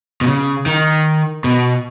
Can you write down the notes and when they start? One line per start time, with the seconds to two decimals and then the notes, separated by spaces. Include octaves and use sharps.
0.21 B2
0.27 C#3
0.66 D#3
1.44 B2